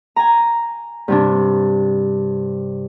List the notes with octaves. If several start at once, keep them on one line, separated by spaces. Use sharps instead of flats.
G#5 A#5
G2 C3 D4